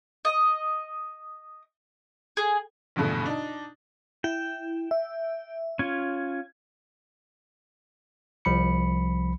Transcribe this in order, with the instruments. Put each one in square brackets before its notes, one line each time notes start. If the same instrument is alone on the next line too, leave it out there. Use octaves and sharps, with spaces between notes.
[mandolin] D#5
G#4
[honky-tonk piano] A#1 E2 G2 B2 D3 A3
D4 D#4
[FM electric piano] E4 [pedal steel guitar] G5
[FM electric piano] E5
[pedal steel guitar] C#4 F4 [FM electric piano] G#6
[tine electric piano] C2 F3 B5 C#7